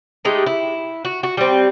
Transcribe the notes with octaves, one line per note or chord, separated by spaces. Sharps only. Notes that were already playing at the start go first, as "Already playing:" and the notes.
G#3 A3 D#4 G4
E4
F#4
F#4
G3 C4